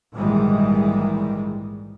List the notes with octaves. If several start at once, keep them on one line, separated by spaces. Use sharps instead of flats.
A#1 G#2 D#3 E3 G3 G#3